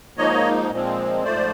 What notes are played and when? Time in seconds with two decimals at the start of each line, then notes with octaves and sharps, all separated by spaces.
0.17 G#2 F3 A#3 D#4 C#5 D#5
0.71 A#2 F3 G#3 C4
1.24 G#2 F3 A3 C5 D5